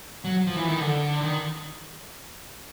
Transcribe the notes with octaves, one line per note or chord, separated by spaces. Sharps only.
F#3
F3
E3
D#3
D3
D#3